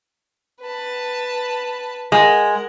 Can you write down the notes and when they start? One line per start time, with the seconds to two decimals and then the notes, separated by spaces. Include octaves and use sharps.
0.61 B4 A5
2.12 G#3 A#4 F#5